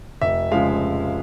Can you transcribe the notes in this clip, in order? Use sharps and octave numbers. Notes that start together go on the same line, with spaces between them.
F1 E5
C#3 F3 G#3 F5